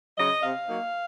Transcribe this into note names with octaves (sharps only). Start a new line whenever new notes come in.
C#3 F#3 D#5
C3 F5
F#3 A#3 D#4